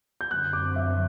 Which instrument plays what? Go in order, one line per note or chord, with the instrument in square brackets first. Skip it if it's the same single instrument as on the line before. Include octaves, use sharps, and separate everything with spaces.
[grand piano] G6
[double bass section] F#2 D3 F#3 C4 [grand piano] F#6
[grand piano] D6
E5